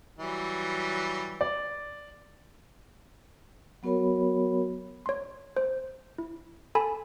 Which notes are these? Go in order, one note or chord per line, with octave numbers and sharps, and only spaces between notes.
E3 F#3 G3
D5
F#3 B3 F#4 A#4 C#5 B5
C#5 C6
C5
E4
A4 G#5 A5 B5